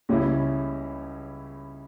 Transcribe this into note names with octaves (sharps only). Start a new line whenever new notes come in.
C#2 C#3 G3 C#4 E4